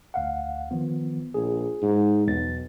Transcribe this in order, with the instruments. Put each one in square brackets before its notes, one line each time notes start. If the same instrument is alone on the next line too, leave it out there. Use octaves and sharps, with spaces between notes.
[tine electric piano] D2 F5 F#5
D#3 F3 B3
[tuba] A#1 [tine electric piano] G#4
[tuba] G#2
[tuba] B1 [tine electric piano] E2 F#3 A6